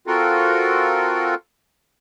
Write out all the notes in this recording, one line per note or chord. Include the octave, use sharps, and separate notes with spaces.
C4 F4 F#4 A4 A#4